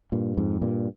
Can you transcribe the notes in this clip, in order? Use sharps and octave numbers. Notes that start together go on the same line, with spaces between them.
G2 A#2
F2 G#2
G2 A#2